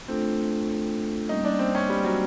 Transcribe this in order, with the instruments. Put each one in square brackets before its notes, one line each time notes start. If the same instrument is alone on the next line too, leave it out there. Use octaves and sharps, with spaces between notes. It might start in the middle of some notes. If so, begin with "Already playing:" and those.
[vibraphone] A3 D4 F4 A4 [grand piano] C4
[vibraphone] G3 A#3 C#4 [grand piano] D#4
[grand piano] D4
C4
C#4
G3
F#3